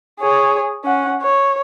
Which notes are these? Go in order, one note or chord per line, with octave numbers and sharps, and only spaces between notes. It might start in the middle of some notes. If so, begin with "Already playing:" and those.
G#4 C#5
C#4 F#5
C#5